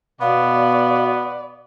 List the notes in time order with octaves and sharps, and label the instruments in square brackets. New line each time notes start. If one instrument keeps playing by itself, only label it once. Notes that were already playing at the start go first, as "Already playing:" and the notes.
[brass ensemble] B2 [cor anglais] B3 [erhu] D5 [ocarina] F5